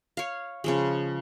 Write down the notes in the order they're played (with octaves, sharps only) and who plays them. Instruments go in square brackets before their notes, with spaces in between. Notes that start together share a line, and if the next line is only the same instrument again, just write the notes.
[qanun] C#5 F5
C#3 F3 G#3